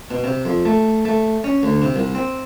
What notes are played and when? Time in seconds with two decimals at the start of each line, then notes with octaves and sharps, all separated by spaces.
0.11 B2
0.24 C3
0.45 F2
0.65 A3
1.05 A3
1.44 C#4
1.63 D2
1.82 C3
1.96 C2
2.15 C4